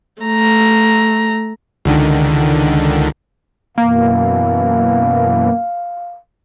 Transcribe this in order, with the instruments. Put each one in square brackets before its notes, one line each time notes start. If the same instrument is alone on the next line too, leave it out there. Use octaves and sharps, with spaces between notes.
[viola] A3 A#5
[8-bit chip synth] C#2 D3 D#3
[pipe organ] F#2 B2 E3 [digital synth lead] A#3 [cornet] F5